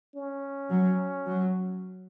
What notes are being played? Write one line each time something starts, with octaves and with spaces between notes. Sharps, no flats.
C#4
F#3
F#3